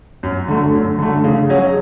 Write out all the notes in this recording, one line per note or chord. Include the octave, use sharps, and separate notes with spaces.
F#2
D3 A3
F#2
D3 A3
C#3
F#3 C#4 G#4